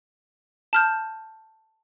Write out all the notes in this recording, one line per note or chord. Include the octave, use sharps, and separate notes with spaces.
A5 F6 G6